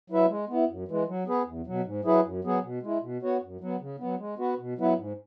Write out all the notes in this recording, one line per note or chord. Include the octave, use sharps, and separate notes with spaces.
F#3 E4 B4 E5
G#3
B3 E4
F#2
E3 G#3
F#3
B3 G#4 B4
E2
B2 F#3
G#2
F#3 E4 G#4 B4
F#2
F#3 B3 G#4
B2
G#3 E4
B2
B3 F#4 C#5
F#2
F#3 B3
C#3
F#3 B3
G#3
B3 F#4 B4
B2
F#3 B3 E4 B4
G#2